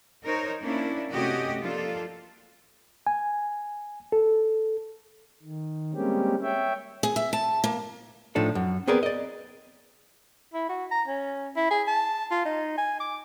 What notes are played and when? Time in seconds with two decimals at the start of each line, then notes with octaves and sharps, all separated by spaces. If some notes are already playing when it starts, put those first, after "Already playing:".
0.24 D#4 A#4 C5 C#5
0.60 A#3 C#4 D4 E4
1.11 C3 A3 C#4 F#4 G4 D#5
1.60 F3 A#3 D4 F4 A4
3.07 G#5
4.12 A4
5.42 D#3
5.94 G3 G#3 A#3 C4 C#4 G4
6.42 C#5 E5 G5
7.03 G#4
7.16 E5
7.33 A5
7.64 A#3
8.35 A2 F3 D4 D#4 A4
8.55 F#2
8.87 B3 C4 G#4 A#4 B4 D5
9.03 D5 D#5
10.54 E4
10.69 F#4
10.91 A#5
11.07 C#4
11.56 E4
11.71 G#4
11.87 A5
12.31 F4
12.45 D#4
12.78 G#5
13.00 D6